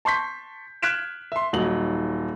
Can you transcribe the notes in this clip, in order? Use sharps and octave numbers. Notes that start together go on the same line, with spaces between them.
A5 C6 C#6 G6 B6
F6 F#6 G#6 B6 D7 E7
E5 C6
D#1 F#3 D#4 F#7